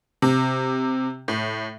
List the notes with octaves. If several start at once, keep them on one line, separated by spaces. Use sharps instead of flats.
C3
A2